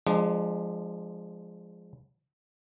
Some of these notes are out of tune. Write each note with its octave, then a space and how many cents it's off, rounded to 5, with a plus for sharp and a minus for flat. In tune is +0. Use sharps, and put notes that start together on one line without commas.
F3 +0 G#3 +0 D4 +35